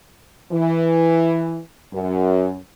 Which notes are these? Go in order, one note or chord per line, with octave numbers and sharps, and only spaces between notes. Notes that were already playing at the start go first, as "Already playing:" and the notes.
E3
F#2